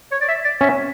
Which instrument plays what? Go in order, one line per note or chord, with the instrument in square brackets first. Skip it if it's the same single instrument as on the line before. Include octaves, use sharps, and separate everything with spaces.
[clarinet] C#5
D5
E5
D5
[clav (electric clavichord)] C#4 [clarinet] E5